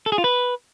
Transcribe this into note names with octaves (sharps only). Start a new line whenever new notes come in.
A4
G#4
F4
B4